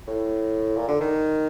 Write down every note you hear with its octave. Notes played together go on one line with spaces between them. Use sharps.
A2
A#2
D3
D#3